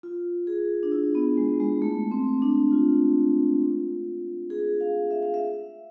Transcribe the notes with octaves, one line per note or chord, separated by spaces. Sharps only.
F4
G#4
D4
E4
B3
G#3
G#3
A3
C4
D4
F4
G#4
F5
E5
F5
E5